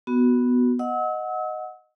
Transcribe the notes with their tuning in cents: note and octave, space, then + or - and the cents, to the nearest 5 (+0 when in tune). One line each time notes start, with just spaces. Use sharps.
B3 +0 F#4 +0
D#5 +0 F#5 -10 E6 -40